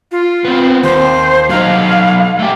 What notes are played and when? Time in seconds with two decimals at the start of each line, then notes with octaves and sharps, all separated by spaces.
0.11 F4
0.45 B3 C4
0.84 D#2 C5
1.50 F#3 D#4 F5
2.39 A3 G4